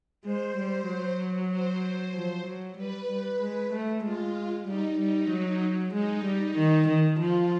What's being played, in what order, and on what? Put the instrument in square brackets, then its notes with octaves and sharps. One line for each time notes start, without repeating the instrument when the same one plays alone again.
[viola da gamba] G#3 [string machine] C5
[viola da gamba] G3
F#3
[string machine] C5
[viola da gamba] F3
F#3
[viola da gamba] G3 [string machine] B4
[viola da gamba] G3
G#3
A3
[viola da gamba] G#3 [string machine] F4
[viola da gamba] G3 [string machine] D#4
[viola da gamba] G3 [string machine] D#4
[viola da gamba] F#3
[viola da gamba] G#3 [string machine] D#4
[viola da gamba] G3
D#3
D#3
[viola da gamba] F3 [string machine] F4